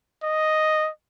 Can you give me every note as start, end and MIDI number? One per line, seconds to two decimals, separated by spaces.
0.23 0.89 75